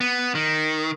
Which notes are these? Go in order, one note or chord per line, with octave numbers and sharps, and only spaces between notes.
B3
D#3